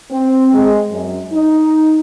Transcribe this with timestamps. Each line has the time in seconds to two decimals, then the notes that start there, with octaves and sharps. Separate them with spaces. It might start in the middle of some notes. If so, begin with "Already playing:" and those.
0.11 C4
0.53 G#3
0.90 F#2
1.33 D#4